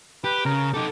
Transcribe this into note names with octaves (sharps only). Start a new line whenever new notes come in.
G4 B4
C#3 A#4
D#4 G4 A4